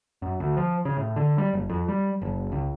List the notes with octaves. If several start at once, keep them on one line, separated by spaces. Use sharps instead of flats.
F#2
D2
F3
C#3
A2
D3
G3
F#1
F2
G3
F#1
C#2